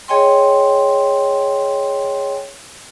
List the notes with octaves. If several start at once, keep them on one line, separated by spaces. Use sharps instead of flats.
G#4 C#5 D#5 G5 G#5 C6